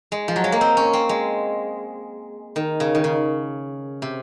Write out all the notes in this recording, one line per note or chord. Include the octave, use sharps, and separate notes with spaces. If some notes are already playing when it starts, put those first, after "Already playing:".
G#3
F3
F#3
G#3
A#3
C4
C#4
C4
G#3
D#3
C#3
D#3
C#3
C3